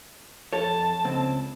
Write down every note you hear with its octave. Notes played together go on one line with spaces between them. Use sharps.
F2 A4 C#5 A5
C#2 C4